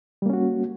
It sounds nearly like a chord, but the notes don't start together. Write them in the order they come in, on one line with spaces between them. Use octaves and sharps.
G3 A#3 C#4 F#4